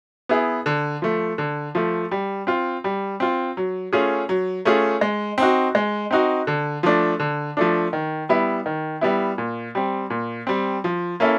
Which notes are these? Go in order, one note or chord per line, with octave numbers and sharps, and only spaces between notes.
B3 E4 G#4
D3
F3 A3
D3
F3 A3
G3
C4 F4
G3
C4 F4
F#3
A3 C#4 F4 G#4
F#3
A3 C#4 F4 G#4
G#3
C4 D#4 F#4
G#3
C4 D#4 F#4
D3
F3 A3 D4
D3
F3 A3 D4
D#3
G3 B3 E4
D#3
G3 B3 E4
A#2
G3 C4
A#2
G3 C4
F3
A#3 C#4 E4 A4